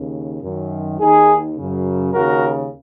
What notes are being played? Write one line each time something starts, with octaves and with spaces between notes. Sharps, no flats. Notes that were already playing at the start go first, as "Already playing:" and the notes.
Already playing: D#2 C#3
F#2 D#3
D#2 D#3 D#4 G#4
F#2 C#3
D#2 C#3 F#4 A#4